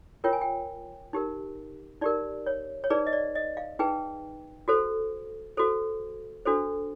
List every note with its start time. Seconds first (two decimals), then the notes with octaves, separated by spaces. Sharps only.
0.24 F4 A#4 C#5 G5
0.33 G#5
0.41 G5
1.13 D#4 G4 A#4
2.01 D#4 G4 A#4 D5
2.46 C#5
2.84 C#5
2.90 D#4 G#4 B4 D5
3.07 D#5
3.13 D5
3.36 D#5
3.57 F5
3.79 D#4 G#4 B4 G5
4.68 F#4 A4 C5
5.57 F#4 A4 C5
6.45 D4 F#4 A4 C5